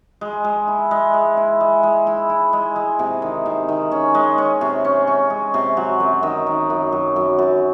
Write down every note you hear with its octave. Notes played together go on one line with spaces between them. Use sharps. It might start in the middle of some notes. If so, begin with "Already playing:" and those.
G#3
G#3
E4
G#3
G#3
E4
G#3
G#3
E4
E4
G#3
G#3
C3
D#3
C3
D#3
C#4
G#3
C#4
C3
C#4
C#4
G#3
C3
F#3
F#2
D#3
D#3
F#2
F#2
F#2
F#2